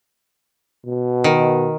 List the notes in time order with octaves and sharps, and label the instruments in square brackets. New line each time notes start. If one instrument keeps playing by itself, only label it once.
[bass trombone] B2
[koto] D#3